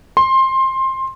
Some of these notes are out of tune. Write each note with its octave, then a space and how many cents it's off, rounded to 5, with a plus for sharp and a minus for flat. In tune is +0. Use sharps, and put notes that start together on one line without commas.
C6 +20